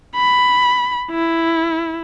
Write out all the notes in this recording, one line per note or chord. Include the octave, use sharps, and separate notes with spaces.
B5
E4